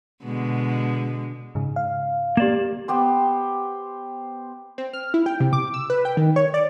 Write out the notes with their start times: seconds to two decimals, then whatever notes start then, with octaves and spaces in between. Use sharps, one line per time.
0.23 B2 D3 G#3
1.55 G#2 C#3
1.76 F5
2.37 A#3 G4 D5 E7
2.88 B3 G4 C5
4.78 C4
4.93 F6
5.14 E4
5.26 G5
5.40 C3
5.53 D6
5.74 E6
5.90 B4
6.05 G5
6.17 D#3
6.36 C#5
6.54 D5